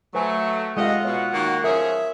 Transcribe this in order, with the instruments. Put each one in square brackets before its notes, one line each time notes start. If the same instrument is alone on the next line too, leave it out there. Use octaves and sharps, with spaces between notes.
[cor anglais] F#3 [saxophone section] A3 [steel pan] B4 C5 G#5
[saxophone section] C3 A3 D#5 [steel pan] G#3 F5 [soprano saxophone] F4 [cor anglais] F#5
[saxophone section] B2 [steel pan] C#5 F5
[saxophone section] D#3 A#3 F#4
[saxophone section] F3 C#4 G#4 [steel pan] A#4 C#5 [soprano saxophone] E5